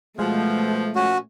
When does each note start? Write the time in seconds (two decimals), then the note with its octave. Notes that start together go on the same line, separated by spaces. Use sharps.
0.19 B2 F3 G#3 A3
0.95 A#2 F3 C#4 F#4